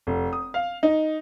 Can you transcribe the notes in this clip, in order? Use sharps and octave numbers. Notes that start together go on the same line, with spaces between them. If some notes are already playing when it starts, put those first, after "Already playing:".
F1
D#6
F5
D#4